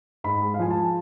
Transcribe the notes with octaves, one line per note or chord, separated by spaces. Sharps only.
G#2 B5
G#3
F5
F3 G#5
A5